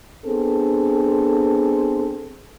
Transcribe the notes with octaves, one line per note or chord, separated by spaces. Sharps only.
B3 C4 D4 G#4 A4